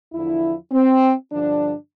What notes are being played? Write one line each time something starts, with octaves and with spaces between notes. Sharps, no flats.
E2 D3 F3 E4
C4
G2 D3 F3 D4